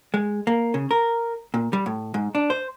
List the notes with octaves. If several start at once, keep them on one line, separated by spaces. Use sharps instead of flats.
G#3
A#3
C#3
A#4
A#2
G3
A2
G#2
D4
C5